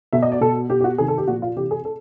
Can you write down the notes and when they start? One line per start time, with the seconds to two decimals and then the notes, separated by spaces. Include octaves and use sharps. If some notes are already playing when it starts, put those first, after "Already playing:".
0.13 B2 E5
0.23 D#5
0.32 D5
0.41 B2 A4
0.70 B2 G4
0.80 G4
0.84 F#4
0.98 C3 D#3 G#4
1.08 A4
1.18 G4
1.27 A#2 F3 F#4
1.42 F4
1.56 C3 E3 G4
1.71 G#4
1.85 A4